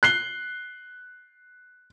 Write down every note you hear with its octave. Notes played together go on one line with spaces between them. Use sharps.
F#6 C7 G7